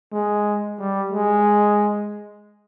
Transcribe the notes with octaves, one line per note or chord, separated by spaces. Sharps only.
G#3
G3
G#3